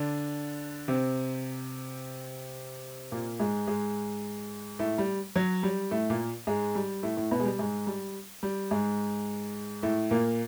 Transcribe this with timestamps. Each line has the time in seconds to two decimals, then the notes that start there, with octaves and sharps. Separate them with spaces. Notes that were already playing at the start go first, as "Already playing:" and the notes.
Already playing: D3 D4
0.88 C3 C4
3.12 A#2 A#3
3.39 G#2 G#3
3.68 G#2 G#3
4.79 A2 A3
4.98 G3
5.36 F#3
5.63 G3
5.91 A2 A3
6.10 A#2 A#3
6.47 G#2 G#3
6.75 G3
7.03 A2 A3
7.17 A2 A3
7.31 B2 B3
7.40 G#3
7.45 G3
7.59 G#2 G#3
7.87 G3
8.43 G3
8.71 G#2 G#3
9.83 A2 A3
10.11 A#2 A#3